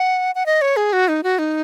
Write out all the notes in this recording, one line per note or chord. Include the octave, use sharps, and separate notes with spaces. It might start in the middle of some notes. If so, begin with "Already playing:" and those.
Already playing: F#5
F#5
D#5
C#5
G#4
F#4
D#4
F#4
D#4